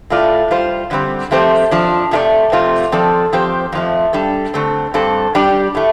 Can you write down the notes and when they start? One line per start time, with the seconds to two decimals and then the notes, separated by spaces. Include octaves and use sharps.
0.10 A2 A3 F4 D5
0.51 G3 F4 C5
0.91 D3 G3 C4
1.31 F3 A3 C4 G4 C5
1.71 F2 F3 D4
2.11 C3 A3 F4 D5
2.52 F2 C3 A3 C4 F4
2.92 F3 C4 A4 D5
3.33 F3 C4 G4 C5
3.72 F2 F3 A3
4.13 G3 D4 A4
4.54 D3 A3 C4
4.94 G2 G3 C4 A4
5.35 G3 D4 G4 D5
5.75 A2 A3